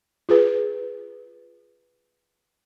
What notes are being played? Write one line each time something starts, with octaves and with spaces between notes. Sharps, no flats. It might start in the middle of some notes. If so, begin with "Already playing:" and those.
F4 G#4 B4